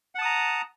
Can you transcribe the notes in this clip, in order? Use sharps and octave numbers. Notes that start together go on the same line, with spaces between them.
F#5 A5 A#5 D#6